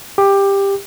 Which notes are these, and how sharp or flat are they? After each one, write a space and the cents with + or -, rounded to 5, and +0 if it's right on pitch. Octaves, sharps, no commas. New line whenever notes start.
G4 +15